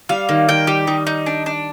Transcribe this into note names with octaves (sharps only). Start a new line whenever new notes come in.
G3 F5
D#3 A#3
D#3 G5
G3 G4
G3 D#4
D#4
D4
D4